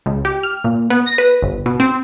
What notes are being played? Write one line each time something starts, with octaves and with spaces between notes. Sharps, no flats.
C#2
G4
F6
A#2
B3
A#6
B4
G1
B2
C4